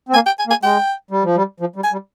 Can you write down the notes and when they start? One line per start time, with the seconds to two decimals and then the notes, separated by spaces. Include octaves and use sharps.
0.09 C4
0.14 A#3 G#5
0.26 G5
0.39 G#5
0.47 A#3
0.50 G#5
0.63 G#3 G5
1.11 G3
1.23 F3
1.36 G3
1.60 F3
1.76 G3
1.84 G#5
1.92 G3